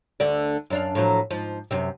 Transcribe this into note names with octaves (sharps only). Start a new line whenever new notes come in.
D2 D3 D5
F#2 D4 F5
A2 F3 F#3
G#2 F3
F#2 C3